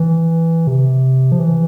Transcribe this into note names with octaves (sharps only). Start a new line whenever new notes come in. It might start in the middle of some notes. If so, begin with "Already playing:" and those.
Already playing: E3
C3
F3
E3